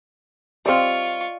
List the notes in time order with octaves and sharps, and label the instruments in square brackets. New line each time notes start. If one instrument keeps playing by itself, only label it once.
[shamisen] G3 C4 [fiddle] F4 C#6 [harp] D5 D#5 F5